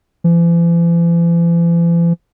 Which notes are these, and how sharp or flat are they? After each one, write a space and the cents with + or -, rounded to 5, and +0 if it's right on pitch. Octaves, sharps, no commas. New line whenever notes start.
E3 +45